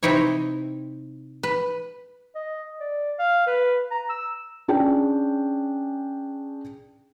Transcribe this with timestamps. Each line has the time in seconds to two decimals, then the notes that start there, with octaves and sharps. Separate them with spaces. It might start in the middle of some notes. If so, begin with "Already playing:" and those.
0.03 C3 C4 D#4 E4 C#5
1.43 B4
2.35 D#5
2.80 D5
3.19 F5
3.47 B4
3.91 A#5
4.10 E6
4.68 C#4 D4 G#4 G5